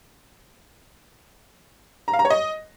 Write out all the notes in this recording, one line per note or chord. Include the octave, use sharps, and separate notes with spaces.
A#5
F5
A#5
C#5
D#5